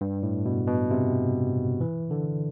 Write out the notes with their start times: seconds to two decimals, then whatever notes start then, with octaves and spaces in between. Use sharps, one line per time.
0.01 G2
0.23 A2
0.45 B2
0.68 B2
0.91 C3
1.81 E3
2.11 D3